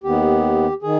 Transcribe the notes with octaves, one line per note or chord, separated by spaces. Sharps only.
D#2 D#3 B3 G4
D#3 G#4